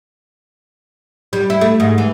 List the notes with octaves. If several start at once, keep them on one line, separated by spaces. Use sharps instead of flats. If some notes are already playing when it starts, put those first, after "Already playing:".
G3
E4
A3
G#2
E3